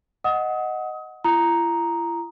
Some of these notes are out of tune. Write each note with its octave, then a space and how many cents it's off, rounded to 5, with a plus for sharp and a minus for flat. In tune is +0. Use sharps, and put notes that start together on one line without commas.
D#5 +0 F#5 +0 D#6 +30
E4 +45 A#5 +5 D#6 +0